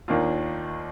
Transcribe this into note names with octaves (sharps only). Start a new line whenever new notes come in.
D#2 D#3 A#3 D4 F4